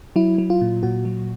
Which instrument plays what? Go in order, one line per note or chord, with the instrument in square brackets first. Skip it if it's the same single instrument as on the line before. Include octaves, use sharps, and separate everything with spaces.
[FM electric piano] F#3 E4
F#3
F4
A#2
A#2 F#4
F#3